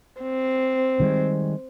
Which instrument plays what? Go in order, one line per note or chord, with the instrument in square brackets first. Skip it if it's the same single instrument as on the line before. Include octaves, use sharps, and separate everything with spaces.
[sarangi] C4
[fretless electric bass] D#3 G3 G#3